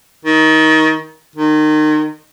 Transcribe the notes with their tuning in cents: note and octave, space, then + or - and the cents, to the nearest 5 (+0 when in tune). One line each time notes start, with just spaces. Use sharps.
D#3 +20
D#3 -25